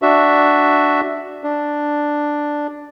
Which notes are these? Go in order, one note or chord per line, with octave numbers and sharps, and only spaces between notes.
D4 F#4 E5
D4